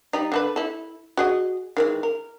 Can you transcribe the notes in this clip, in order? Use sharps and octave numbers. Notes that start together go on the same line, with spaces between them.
G3 D#4
D3 A4 B4
E4 A4
F#4 G#4 D#5
D#3 E3 G#3
A#4